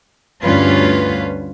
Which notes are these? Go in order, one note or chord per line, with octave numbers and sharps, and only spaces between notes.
D2 G2 C#4 F4 B4